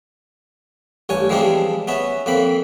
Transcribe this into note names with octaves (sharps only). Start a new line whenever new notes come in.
A1 G2 C#5 G#5
E3 F3 G3 G#3 C4 D4
B3 C#4 E5
F2 A#3 C4 B5